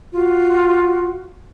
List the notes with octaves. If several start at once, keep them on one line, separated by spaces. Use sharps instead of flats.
F4 F#4